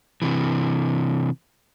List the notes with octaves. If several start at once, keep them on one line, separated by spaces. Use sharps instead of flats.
C3 E3